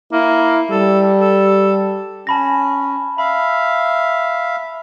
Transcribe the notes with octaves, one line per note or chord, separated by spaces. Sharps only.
A#3 E4
G3 A4
A4
C#4 A5 B5 A#6
E5 F5 B5